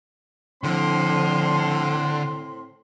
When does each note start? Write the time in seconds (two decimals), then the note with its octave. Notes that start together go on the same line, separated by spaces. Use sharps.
0.63 A2 D3 F3 C4 C6